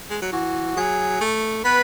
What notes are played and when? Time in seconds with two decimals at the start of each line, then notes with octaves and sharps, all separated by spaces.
0.10 G#3
0.22 F#3
0.32 E3 F#4
0.76 F#3 G#4
1.21 A3
1.64 B3 B4 B5